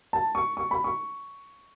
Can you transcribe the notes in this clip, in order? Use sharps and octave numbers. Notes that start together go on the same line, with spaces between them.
A5
C#6
C#6
B5
C#6